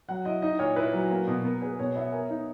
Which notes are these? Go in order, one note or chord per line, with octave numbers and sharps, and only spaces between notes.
F#3 F#5
E4 D#5
D#4 D#5
A#2 C#5
E4 B4
F#3
A#3
B2
B3 A#4
G#4 B4
B2 C#5
B3 E5
A#4 G#5
D#4